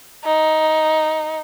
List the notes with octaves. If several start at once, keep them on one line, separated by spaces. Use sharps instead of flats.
D#4